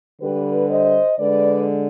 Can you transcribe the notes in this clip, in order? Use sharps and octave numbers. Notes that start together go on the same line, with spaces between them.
D3 G3 G4 B4
C5 D#5
D3 G#3 B4 D5